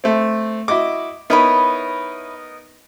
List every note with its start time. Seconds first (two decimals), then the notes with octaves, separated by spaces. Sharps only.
0.04 A3 C4
0.68 E4 F#4 D#5 D6
1.30 B3 D#4 E4 A#4 C#5 B5